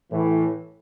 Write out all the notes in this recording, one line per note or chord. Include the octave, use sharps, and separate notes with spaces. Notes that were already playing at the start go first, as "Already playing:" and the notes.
A2 E3 A3